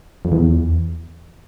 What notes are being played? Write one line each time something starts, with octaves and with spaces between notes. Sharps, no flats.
F2
E2